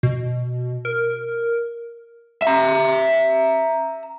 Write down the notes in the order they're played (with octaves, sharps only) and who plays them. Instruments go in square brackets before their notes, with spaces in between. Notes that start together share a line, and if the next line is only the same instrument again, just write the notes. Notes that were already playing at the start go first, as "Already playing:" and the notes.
[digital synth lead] B2
A#4
[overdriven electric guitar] E5 A#5